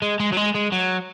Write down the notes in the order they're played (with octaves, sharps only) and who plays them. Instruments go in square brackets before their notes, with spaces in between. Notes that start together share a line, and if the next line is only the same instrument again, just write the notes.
[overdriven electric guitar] G#3
G#3
F#3
G#3
G#3
F#3